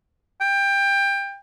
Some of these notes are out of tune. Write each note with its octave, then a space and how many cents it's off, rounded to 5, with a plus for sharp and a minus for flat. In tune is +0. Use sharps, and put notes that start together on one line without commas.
G5 +20